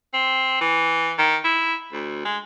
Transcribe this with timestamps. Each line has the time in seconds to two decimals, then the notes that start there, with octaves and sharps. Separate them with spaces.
0.14 C4
0.61 E3
1.18 D#3
1.44 E4
1.92 D2
2.25 G#3